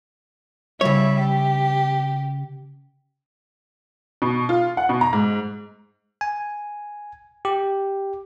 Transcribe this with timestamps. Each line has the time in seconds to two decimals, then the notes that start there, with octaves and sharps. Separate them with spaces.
0.81 C#3 G3 E4 C#5 E5
1.20 G4
4.22 B2
4.49 F4
4.77 F#5
4.89 B2
5.01 A#5
5.13 G#2
6.21 G#5
7.45 G4